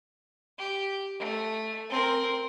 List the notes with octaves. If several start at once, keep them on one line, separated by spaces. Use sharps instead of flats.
G4
A3
C4 A#4